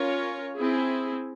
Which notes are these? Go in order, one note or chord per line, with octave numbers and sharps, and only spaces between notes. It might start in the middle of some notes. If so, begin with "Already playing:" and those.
Already playing: C#4 F4 A#4 C#5
C4 E4 G#4